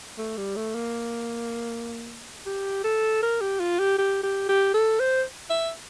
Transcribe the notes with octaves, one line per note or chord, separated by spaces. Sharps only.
A3
G3
A3
A#3
G4
A4
A#4
G4
F4
G4
G4
G4
G4
A4
C5
E5